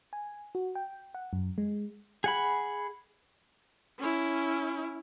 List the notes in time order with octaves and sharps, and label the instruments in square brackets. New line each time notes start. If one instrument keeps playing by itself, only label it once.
[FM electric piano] G#5
F#4
G5
F#5
F#2
G#3
[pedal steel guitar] G#4 F#5 B5
[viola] C#4 E4